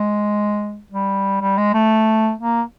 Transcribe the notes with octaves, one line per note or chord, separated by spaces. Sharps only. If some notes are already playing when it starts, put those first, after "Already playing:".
Already playing: G#3
G3
G3
G#3
A3
A#3